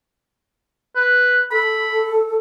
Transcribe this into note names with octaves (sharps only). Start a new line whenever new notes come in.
B4
A4 B5